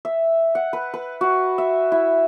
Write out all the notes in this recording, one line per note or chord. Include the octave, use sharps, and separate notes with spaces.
E5
F#5
B4
B4
F#4
E5
E4